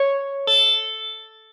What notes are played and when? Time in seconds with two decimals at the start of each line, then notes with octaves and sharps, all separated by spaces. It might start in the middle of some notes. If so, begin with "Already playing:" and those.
Already playing: C#5
0.47 A4